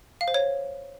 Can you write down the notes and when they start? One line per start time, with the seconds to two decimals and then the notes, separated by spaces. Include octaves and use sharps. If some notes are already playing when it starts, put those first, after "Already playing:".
0.21 F5
0.28 C5
0.34 C#5